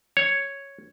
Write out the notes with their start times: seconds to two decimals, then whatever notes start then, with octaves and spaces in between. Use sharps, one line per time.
0.17 C#5